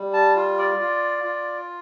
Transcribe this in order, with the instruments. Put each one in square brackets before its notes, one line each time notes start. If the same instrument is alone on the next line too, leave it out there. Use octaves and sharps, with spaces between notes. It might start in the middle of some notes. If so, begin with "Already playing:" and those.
Already playing: [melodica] G3
A5
F4
D5
F4
F4